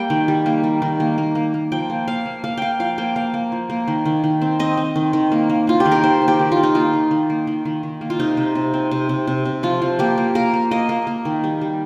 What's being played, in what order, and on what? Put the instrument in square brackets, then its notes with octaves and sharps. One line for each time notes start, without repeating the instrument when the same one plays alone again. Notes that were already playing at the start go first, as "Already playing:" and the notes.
Already playing: [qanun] G3 A#3 G5
D#3
G3
A#3
G3
D#3
A#3
A#3
A#3
A#3
F3 G5
A#3
A#3 F5
A#3
A#3 F5
A#3 F5 G5
F3 F5
A#3 G5
A#3 F5
A#3
F3
A#3
D#3
D#3
D#3
C4
C4 D#5
C4
D#3
D#3
A#3
A#3
A#3 F4
G4
D#3
A#4
D#3 C5
A#3
G4
D#3
F4
D#3
D#4
A#3 F4
D#3
D#3
A#3
D#3
D#3
D#3
A#3
F4
C3 D#4
C3
C3
C4
C3
C3
C3
C3
F3 F4
F3
A#3 G4
A#3
A#3 A#4
A#3
A#3 D#5
A#3
A#3
D#3
G3
G3